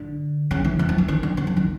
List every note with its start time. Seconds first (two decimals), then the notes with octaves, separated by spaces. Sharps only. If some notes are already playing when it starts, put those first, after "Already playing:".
Already playing: D3
0.51 C#3
0.65 E3
0.79 E3
0.89 F3
0.98 E3
1.08 D#3
1.23 D3
1.37 C#3
1.47 F3
1.57 D#3